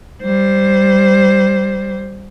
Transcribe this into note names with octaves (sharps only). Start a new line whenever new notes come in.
G3 C5